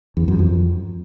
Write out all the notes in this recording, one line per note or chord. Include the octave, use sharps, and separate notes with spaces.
E2
F#2
F2